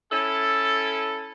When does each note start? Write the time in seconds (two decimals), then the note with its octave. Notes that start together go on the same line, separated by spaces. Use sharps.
0.12 C#4 E4 A4